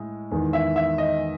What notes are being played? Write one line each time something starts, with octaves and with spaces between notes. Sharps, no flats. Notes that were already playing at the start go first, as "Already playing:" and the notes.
Already playing: A2 G#3
E2 D#3 G#3
E5
E5
D#5